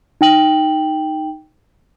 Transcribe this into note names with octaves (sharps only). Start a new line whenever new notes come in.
D#4 G5 F#7